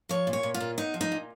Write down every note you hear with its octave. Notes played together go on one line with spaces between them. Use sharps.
F3 C#5
A#2
C#5
A#2
F4
A#2
B3 D#4
F3
D#4
A#2